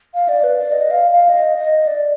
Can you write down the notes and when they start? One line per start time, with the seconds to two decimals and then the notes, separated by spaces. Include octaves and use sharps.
0.14 F5
0.29 D5
0.44 B4
0.58 D5
0.72 D#5
0.91 F5
1.11 F5
1.29 D#5
1.58 D#5
1.87 D5